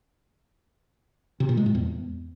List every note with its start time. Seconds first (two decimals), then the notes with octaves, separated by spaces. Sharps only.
1.40 C3
1.49 A#2
1.57 G#3
1.66 A2
1.75 E2